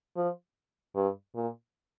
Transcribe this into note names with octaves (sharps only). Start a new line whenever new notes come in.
F3
G2
A#2